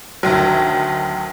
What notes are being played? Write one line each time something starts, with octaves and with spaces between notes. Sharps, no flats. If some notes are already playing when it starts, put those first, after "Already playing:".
D2 D#3 F#3